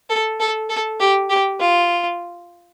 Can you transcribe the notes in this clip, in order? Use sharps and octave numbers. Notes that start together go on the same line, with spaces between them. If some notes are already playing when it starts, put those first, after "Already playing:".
A4
A4
A4
G4
G4
F4